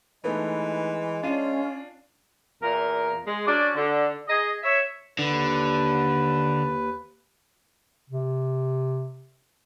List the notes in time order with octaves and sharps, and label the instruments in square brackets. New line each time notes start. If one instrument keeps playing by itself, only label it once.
[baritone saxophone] E3 [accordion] G#3 [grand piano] A3 B3 D#4
[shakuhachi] C#4 [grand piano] D4 F5 D#7 [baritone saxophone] F4
[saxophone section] E2 A#2 A#4
G#3
C#4 D4 F#4 D5
D3
G#4 D#5
C#5 E5
[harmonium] D#2 B4 [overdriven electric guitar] D3
[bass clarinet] C3